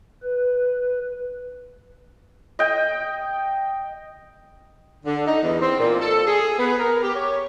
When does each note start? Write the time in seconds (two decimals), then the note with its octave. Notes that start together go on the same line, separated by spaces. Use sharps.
0.22 B4
2.59 D#5 G5
5.05 D3
5.27 D#4
5.43 E2
5.61 C4
5.79 A#2
6.01 A4
6.27 G#4
6.59 B3
6.79 A#4
7.03 G4
7.15 C#5